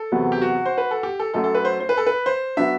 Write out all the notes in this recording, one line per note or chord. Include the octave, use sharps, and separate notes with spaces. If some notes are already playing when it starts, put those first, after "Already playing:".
Already playing: A4
E2 C3 F#3 B3
G4
F#4
C5
B4
A4
G4
A4
F#2 F#3 A3 A4
A4
B4
C5
C5
B4
A4
B4
C5
F#3 B3 D4 E5